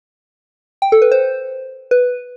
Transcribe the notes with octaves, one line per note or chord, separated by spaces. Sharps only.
G5
A4
B4
C5
B4